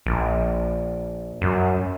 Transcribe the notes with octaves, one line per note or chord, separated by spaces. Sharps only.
A#1
F#2